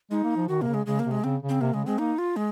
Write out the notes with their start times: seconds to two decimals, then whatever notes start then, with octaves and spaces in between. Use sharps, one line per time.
0.11 G#3 D#4
0.24 A#3
0.37 F3
0.49 D#3 F#4
0.62 C3 A#3
0.68 C#3
0.74 G#3
0.86 C#3 G#3
0.99 A#3
1.06 C3
1.11 G#3
1.24 C#3 C4
1.43 C#3
1.49 C4
1.61 C3 A#3
1.74 C#3 G#3
1.86 G#3 C4
1.98 A#3 D#4
2.18 F4
2.36 G#3